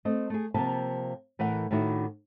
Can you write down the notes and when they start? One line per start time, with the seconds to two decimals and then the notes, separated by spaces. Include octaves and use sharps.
0.05 A3 C4 D#5
0.30 A3 G#4
0.54 C3 F3 A#3 A5
1.39 A2 E3 A#4 F#5
1.71 A2 D#3 D4 E4 F#4